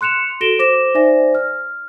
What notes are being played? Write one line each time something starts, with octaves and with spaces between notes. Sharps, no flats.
C6 F#6 C#7 E7 F7
F#4 A4 A#6 D7 E7 G7
C5 D6 A#6 E7
D#4 C5 D5 E5 G#5 A#6
F6